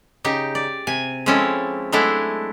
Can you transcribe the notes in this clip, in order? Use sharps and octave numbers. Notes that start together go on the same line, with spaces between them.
C#3 D#4 G4
D5
C3 G#5
F3 G#3 C4 C#4 E4 A4
F#3 G#3 A3 D4 E4 G#4